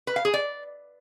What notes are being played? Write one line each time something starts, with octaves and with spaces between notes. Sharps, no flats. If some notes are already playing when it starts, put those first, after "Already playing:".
B4
F5
G#4
D5